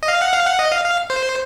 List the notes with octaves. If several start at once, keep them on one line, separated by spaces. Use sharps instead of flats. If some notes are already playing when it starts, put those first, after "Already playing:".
D#5
F5
F#5
F5
F#5
D#5
F5
F5
C5